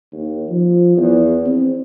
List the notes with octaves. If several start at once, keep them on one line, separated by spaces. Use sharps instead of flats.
D#2
F3
E2
C4